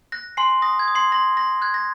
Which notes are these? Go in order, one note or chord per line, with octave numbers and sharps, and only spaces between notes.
F#6 A#6
G#5 C6 C7
D#6 A#6
G#6
D#6
C6 C7
C6 A#6
C6 A#6
F#6 G#6
A#6